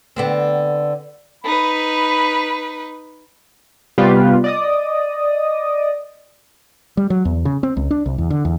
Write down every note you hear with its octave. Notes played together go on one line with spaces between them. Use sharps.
D3 B3 C4
D#4 B4 B5
C3 G3 B3 F4 G4 B4
D5 D#5 D#6
G3
F#3
E2
C#3
C4
C#2
D4
C2
E2
D3
E2